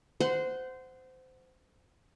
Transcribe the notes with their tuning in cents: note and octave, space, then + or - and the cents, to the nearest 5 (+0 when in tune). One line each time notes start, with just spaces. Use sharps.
C5 -20 F#5 +0